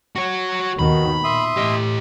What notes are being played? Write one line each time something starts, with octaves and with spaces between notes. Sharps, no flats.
F#4 C#5
D#2 B2 D#3 F#4 B5
A#2 E5 C6 D#6
A2 G4 D#5